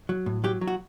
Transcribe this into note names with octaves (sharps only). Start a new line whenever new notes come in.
F#3
A2
F#3 G4
F#3
F#4